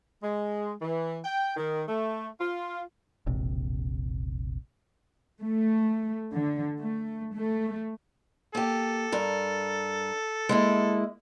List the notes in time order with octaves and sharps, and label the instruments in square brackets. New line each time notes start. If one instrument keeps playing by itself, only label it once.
[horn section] G#3
E3
G5
D#3
A3
F4
[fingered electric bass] E1 A#1 C3
[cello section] A3
D3
A3
A3
[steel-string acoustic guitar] A#3 G4 [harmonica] A4
[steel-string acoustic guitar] G2 A#4
G#3 A#3 E4